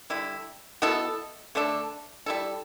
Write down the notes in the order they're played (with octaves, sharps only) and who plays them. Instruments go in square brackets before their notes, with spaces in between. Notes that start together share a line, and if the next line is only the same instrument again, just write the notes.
[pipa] D3 G3 E4
B2 B3 E4 A4
D3 A3 D4 A4
G3 E4 A4